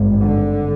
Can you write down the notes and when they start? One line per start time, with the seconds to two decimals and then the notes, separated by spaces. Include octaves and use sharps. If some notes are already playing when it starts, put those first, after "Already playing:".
Already playing: G#1 G2
0.23 D3